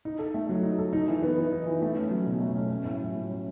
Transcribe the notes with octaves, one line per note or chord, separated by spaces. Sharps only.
D#4
A4
A3
F#3
D#4
A4
D#4
E3
B3
E3
D#4
E3
A3
C#4
F#3
B2
A3
C#4
C#4
A2
F#3
A2
C#4